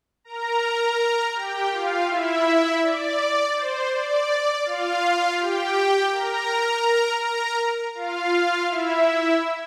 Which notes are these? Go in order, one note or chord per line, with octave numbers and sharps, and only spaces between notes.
A#4 A#5
G4 G5
F4 F5
E4 E5
D5
C5
D5
F4 F5
G4 G5
A#4 A#5
A#4 A#5
F4 F5
E4 E5